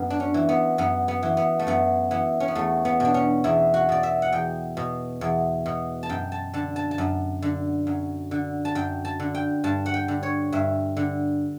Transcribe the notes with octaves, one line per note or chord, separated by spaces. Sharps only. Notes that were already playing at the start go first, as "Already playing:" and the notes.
Already playing: F#2 B3
D4
C#4
E3
B3
F#2 B3
B3
E3
B3
A3
F#2 B3
E3 B3
C#4
B3
E2 A3
B3
B2 D4
C#4
E2 E4
F#4
B2 D5
E5
F#5
E2 G5
B2
E2
B2
A5
F#2 G5
A5
D3 A5
A5
A5
F#2
D3
F#2
D3
A5
F#2 G5
A5
D3
G5
G2 A5
F#5
G5
D3
C#5
G2 E5
D3